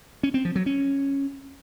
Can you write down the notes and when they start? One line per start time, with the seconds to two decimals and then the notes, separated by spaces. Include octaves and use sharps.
0.23 C#4
0.34 C4
0.45 F3
0.56 F#3
0.66 C#4